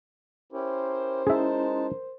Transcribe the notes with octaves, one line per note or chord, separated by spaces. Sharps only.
C#4 E4 G4 A#4 C5
G#3 C#4 D#4 E4 G#4 E5 A5